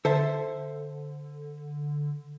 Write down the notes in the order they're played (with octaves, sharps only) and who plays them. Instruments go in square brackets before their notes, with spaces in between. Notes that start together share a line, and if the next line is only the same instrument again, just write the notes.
[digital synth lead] D3 [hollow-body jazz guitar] A4 C5 E5